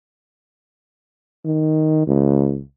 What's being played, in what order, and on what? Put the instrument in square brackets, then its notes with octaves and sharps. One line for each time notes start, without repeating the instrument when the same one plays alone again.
[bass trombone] D#3
C#2